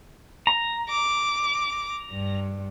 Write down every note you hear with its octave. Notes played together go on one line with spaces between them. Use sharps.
A#5
D6
G2